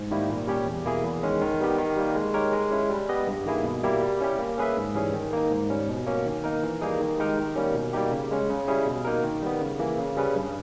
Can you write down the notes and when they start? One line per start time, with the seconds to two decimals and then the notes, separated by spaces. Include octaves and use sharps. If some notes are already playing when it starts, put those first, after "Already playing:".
Already playing: G#2
0.11 D#3 G3 A#3 E4
0.30 A#2
0.47 G3 C#4 G4 C#5
0.66 E2
0.85 B2 A#3 E4 G#4
1.04 E2
1.23 D#3 G#3 C#4
1.41 D#3
1.60 G3 B3 G4
1.78 D#3
1.97 G3 A#3
2.16 G#3
2.34 D#4 G4 A#4 C#5
2.52 G#3
2.71 C#4 E4
2.90 G3
3.09 B3 G4 B4 D#5
3.27 G2
3.46 D#3 A#3 E4 G#4
3.64 B2
3.83 G3 A#3 E4 G4
4.03 G3
4.21 C#4 E4 G4
4.39 A#3
4.58 C#4 G#4 B4 E5
4.77 G#2
4.95 E3 G3 C#4 G#4
5.13 D#3
5.33 A#3 D#4
5.51 G#2
5.70 G3 C#4
5.89 B2
6.06 A#3 C#4
6.25 D#3
6.44 A#3 D#4 A#4
6.63 E3
6.81 G3 A#3 D#4 G#4
7.00 D#3
7.18 G#3 D#4 G4 A#4
7.37 D#3
7.56 G3 A#3 C#4
7.74 B2
7.93 G3 A#3 D#4 G4
8.12 C#3
8.31 G#3 C#4
8.49 C#3
8.68 G3 C#4 E4 G#4
8.87 B2
9.05 A#3 D#4 A#4
9.23 D#3
9.42 G3 B3
9.61 C#3
9.79 E3 A#3
9.98 C#3
10.17 G3 C#4 G#4 B4
10.36 G2